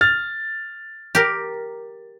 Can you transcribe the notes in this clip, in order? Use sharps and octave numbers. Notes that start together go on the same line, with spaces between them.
F6 A6
G4 A#4